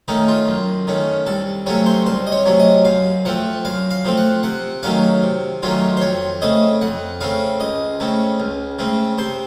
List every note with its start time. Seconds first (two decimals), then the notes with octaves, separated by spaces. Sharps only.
0.08 D#3 A3 C#4 D#4
0.28 F4
0.48 F#2
0.87 D#3 A3 C#4
1.26 C2 A4
1.66 C3 F#3 A3 C#4 C#5
1.86 C5
2.06 C2 C5
2.27 D#5
2.32 C#5
2.45 C3 F#3 A3 C#4
2.59 D#5
2.85 F#2 F5
3.25 F3 A3 C4 F#5
3.65 F#2 F5
3.91 F5
4.05 F3 A3 C4
4.17 F#5
4.43 C3 F#5
4.83 D#3 F#3 A3 C#4 F5
5.22 C3
5.63 D#3 F#3 A3 C#4 F4
5.97 C5
6.01 F2 C#5
6.42 C#3 A3 C4 D#5
6.81 F2 F#5
7.21 C#3 A3 C4 F5
7.60 C#2 D#5
8.00 C#3 A3 C4
8.40 C#2
8.79 C#3 A3 C4
9.18 C3 C5